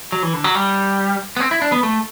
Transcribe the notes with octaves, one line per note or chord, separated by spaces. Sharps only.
F#3
E3
D3
F#3
G3
B3
C4
E4
D4
B3
A3